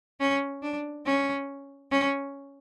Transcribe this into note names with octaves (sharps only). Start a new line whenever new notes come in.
C#4
D4
C#4
C#4